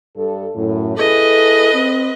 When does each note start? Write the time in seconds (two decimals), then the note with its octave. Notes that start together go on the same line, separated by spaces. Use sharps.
0.17 G2 A4
0.56 F#2 A2
0.98 E4 G#4 A4 B4 D#5
1.74 C4